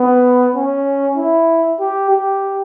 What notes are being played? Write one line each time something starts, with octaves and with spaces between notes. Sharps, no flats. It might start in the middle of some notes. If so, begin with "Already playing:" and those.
Already playing: B3
C#4
E4
G4
G4